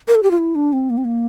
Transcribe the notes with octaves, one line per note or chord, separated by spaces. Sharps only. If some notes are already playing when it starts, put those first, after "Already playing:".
A#4
A4
G4
F4
E4
D4
C4
A#3
C4
A#3